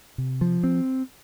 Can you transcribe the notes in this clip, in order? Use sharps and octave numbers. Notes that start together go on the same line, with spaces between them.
C3
F3
C4